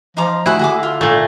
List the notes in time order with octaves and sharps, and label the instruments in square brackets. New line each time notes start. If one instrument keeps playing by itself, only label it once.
[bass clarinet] F3 [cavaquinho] D#4 A#5 D6
[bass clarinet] A3 [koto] E4 [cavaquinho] F#4 G#4 F#5
[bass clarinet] D3 [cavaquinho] F#4 G#4 D6
[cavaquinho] F4
[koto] A#2 A3